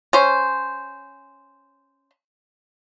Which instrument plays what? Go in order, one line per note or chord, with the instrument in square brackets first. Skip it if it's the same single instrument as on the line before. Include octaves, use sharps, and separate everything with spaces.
[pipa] C#4 C5